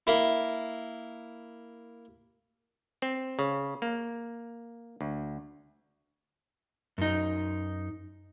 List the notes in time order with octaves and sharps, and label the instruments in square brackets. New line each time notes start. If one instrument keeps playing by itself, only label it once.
[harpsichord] A#3 E4
[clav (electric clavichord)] C4
C#3
A#3
D2
[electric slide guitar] F#2 D#4